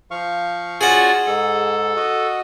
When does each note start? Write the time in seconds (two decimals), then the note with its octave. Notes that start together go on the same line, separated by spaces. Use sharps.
0.11 F3 F5 C#6
0.81 C#4 F4 F#4 G#4 D5 F#5 C#6
1.26 G#2 A4
1.96 F#4 D#5